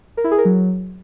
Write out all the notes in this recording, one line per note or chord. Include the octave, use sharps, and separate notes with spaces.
A#4
E4
G#4
A#4
F#3